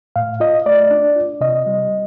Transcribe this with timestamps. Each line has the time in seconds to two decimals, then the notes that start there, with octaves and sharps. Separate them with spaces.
0.16 A2 F5
0.40 F4 D#5
0.66 A3 D5
0.91 D4
1.16 F4
1.41 C3 D#5
1.67 G3